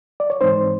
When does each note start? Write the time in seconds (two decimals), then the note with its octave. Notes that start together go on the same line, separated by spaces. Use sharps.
0.20 D5
0.30 C#5
0.41 G#2 E3 G#3 C4 D#4 C5